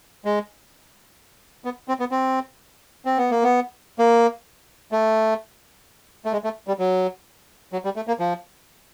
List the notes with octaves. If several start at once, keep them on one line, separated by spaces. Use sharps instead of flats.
G#3
B3
C4
B3
C4
C4
B3
A#3
B3
A#3
A3
A3
G#3
A3
G3
F#3
F#3
G3
A3
A#3
F3